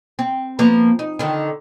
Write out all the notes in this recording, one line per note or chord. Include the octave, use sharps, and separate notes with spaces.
C4
F3 A#3 B3
D#4
D3 D#3